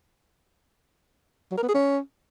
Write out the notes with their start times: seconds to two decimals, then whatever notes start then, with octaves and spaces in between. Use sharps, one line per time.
1.52 F#3
1.57 A#4
1.63 B3
1.69 G#4
1.74 C#4